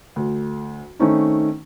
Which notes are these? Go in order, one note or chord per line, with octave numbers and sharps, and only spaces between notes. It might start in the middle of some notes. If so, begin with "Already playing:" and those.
D2
D#3 A3 C4 C#4 D#4